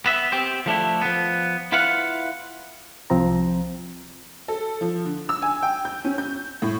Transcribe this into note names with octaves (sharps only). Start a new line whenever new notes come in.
B3 E5
C4 G4 C5
F3 A3 D4 E4
F3 B3
E4 F4 B4 F5 F#5
C2 F3 C4 A#5
A4
F3
D3
E6
G#5
G5
G6
C#4
G6
A2